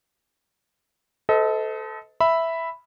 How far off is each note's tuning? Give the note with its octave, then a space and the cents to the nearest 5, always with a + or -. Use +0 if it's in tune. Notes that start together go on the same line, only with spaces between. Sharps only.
A4 -5 C5 -45 D#5 +30
E5 +0 B5 +0